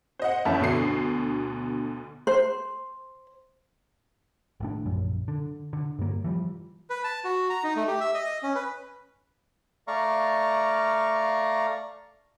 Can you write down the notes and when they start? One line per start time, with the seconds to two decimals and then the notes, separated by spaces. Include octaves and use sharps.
0.19 C5 D#5 F#5
0.45 F#1 E2 C#4 E5 A5
0.59 D2 B2 D3 C7
2.27 C5
4.60 G#1 A2 D4
4.86 A#1 F#2
5.28 D3
5.73 D3
5.99 G2 A#3
6.24 E3 F3 G3
6.90 B4
7.04 A5
7.24 F#4
7.50 A#5
7.64 D#4
7.76 A3
7.88 G4
8.00 E5
8.14 D#5
8.43 C#4
8.55 B4
9.87 A3 D5 F5 A#5 C#6